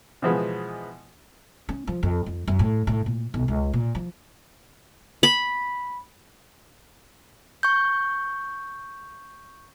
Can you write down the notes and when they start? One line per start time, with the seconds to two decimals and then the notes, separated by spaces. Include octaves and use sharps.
0.22 B2 E3 F3 G#3 B3
1.69 C#4
1.87 F3
2.03 F2
2.26 F2
2.48 F#2
2.59 A2
2.87 A2
3.06 A#2
3.34 B1
3.48 C#2
3.73 A#2
3.95 F3
5.23 B5
7.63 C#6 G6